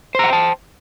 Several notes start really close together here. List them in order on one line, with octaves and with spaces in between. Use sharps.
C5 A#5 F#5 G5 A5